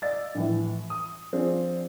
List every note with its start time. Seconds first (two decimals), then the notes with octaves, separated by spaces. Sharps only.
0.02 D5 D#5 F5 E6 A6
0.35 A#1 A2 E3
0.90 D#6
1.33 F3 C4 D4 F4 G#4